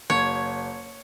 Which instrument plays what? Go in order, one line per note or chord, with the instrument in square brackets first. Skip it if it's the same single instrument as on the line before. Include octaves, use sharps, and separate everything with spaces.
[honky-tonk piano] F#1 G#6 [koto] C#5